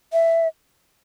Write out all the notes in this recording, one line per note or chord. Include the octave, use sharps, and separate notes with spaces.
E5